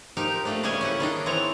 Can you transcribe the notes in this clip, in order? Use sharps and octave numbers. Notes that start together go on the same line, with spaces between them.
F3 D#4 G4 A#4
A3 A#3 D4
C#3 G3 C#4 G#4 D#5 G#5
C#4 E4 F#5
D#3 D4 D#5
E3 C4 C#5 A#5